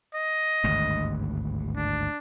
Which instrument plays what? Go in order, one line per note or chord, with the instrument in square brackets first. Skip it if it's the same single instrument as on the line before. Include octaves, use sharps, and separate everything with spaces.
[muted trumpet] D#5
[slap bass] G#1 D2 G2
[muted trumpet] D4